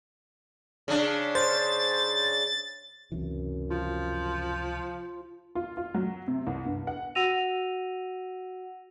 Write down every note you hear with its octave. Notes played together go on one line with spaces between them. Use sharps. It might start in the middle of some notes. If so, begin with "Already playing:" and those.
C#3 D4
C5 A6
C#2 F#2 C3 E3
F3 F4
F4
F4
F#3
C3
C2
G2
F#5
F#4 F#5 E6 A#6 D#7 F7